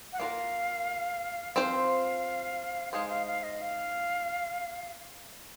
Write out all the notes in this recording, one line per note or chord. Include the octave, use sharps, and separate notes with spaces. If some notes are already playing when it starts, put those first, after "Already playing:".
F#5
A#3 F4 A#4 F5
F3 C4 F4 C5 F5
G#3 D#4 G#4 C5 F5
F5
F5
D#5
F5